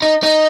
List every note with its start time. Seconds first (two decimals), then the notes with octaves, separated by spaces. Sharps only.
0.02 D#4
0.23 D#4